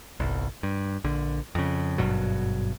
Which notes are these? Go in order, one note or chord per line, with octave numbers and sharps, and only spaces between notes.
G1 C2
G2
A#1 D3
F2 C#3
G#1 G2 B2 F#3